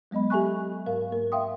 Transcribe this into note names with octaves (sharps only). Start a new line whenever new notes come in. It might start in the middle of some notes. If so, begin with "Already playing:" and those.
F#3 G#3 B3 D#5 B5
G4 A4 E5 G#5 C#6 F#6
G#2 A#4 F5
A#3 A#4
E5 F5 G5 C6 D#6